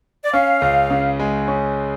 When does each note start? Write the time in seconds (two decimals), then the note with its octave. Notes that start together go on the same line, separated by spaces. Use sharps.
0.25 D5
0.33 C#4 F5
0.62 C#2
0.90 C#3
1.19 G#3
1.48 C#4